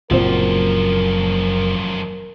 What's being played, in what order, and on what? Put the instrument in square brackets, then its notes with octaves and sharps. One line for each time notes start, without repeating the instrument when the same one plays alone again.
[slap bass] F#1 [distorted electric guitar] F#2 F3 [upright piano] A#2 C4 [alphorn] A#4